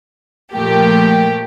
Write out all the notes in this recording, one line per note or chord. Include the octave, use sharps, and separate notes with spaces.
A#2 F3 A3 G4 A#4